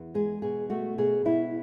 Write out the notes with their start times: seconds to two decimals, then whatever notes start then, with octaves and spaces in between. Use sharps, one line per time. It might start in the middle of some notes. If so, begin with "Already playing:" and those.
Already playing: E2
0.14 G#3 G#4
0.42 B2 G#4
0.70 A3 F#4
0.98 B2 G#4
1.25 B2 E4